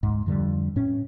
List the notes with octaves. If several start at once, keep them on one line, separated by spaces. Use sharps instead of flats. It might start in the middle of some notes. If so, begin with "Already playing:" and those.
D2 G#2
F2 D3 G3
A2 C#4